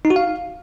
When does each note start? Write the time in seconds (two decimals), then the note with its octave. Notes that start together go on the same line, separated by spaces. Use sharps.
0.05 D#4
0.10 F#4
0.16 F5